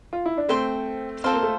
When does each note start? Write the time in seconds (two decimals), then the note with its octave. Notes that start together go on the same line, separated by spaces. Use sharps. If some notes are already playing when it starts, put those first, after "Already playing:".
0.13 F4
0.26 E4
0.37 D4
0.49 A3 C4 C5 G5 C6
1.24 C4 F4 A4 C5 F5
1.33 A#3
1.42 A3